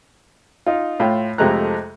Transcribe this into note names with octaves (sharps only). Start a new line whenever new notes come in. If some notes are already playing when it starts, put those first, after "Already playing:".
D#4 F4
A2 F4 G5
F2 C3 G#3 A3 A#5 F#6